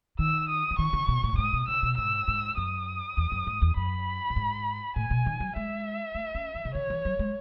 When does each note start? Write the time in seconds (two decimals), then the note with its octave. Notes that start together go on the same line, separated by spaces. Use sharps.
0.19 D#3 E6
0.49 D#6
0.71 E3
0.78 D#3 C#6
0.93 C#3
1.08 B2
1.24 A2
1.33 F#2
1.38 G#2 D#6
1.53 B2
1.68 C#3 E6
1.83 B2
1.97 G#2 E6
2.28 G#2
2.57 F#2 D#6
3.17 E2
3.32 F#2
3.47 G#2
3.62 E2
3.77 F#2 B5
4.30 A2
4.36 G#2
4.96 A2 G#5
5.11 B2
5.26 D#3
5.40 F#3
5.56 G#3 E5
6.15 A3
6.35 C#4
6.55 E3
6.65 C#3
6.74 D#3 C#5
6.90 E3
7.05 F#3
7.19 G#3